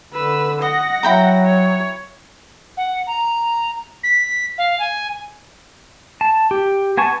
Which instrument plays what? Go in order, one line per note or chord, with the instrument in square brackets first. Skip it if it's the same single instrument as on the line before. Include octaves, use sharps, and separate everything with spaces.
[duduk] D3 [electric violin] B4 E6
[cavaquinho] D#5 [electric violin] F#5 A#6
[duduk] F#3 [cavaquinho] E4 G5 A#5
[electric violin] C#5
[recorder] F#5
A#5
B6
F5
G#5
[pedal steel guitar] A5
G4
B3 G#5 A5 C#6